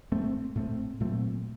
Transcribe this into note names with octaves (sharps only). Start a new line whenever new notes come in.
A2 A3 C4
A2 A3 C4
A#2 F#3 A3 C4